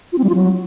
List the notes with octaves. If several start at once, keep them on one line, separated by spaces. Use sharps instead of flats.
F4
C4
G3
F4
F#3